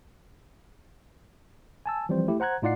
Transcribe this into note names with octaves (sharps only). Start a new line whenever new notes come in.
G#5 A5 E6
E3 F3 G3 C4 C5
A3 E4 G4
C5 F#5 A#5 F#6 G#6
A2 D#4 F4 D5 F#5 C7